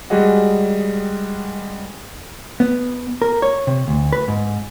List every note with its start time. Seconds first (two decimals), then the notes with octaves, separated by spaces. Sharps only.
0.10 G3 G#3 F#4 G#4 D#5 F#5
2.60 B3
3.22 A#4
3.42 C#5
3.67 C3
3.88 D2
4.13 B4
4.28 G#2